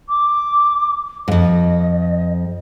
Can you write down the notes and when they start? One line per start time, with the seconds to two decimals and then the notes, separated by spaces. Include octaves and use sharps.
0.09 D6
1.28 F2 G#2 D#5